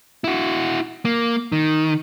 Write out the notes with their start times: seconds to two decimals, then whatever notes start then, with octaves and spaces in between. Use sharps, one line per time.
0.24 E4 F#4
1.05 A#3
1.52 D#3